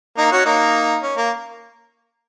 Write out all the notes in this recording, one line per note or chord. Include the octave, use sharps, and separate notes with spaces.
A#3 D#4
C#4 F#4
A#3 D#4
C#4
A#3